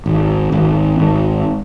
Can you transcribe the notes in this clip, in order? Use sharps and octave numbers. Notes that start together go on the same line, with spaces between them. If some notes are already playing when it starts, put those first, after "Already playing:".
G#1
G#1
G#1